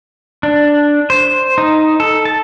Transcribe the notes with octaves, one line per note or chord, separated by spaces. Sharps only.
D4
C5
D#4
A4
A5